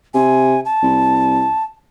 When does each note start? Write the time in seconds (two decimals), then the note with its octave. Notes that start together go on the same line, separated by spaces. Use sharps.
0.14 C3 G#5
0.65 A5
0.83 C2